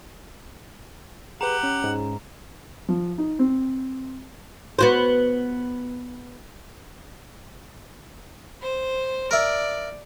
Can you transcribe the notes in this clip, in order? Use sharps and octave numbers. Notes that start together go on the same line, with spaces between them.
G4 G#4 B4 F#5 A#5
C#4
G#2
F3
D#4
C4
B3 F#4 C5
C5
A#4 D5 E5